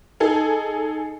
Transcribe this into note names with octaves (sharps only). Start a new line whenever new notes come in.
D#4 G#4 A4